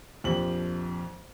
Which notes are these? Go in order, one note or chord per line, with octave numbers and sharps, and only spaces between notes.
A#1 F2 G4 C5 F#7